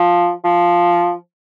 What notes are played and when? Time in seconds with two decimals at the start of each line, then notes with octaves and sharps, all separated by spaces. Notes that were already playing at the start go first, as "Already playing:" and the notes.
Already playing: F3
0.44 F3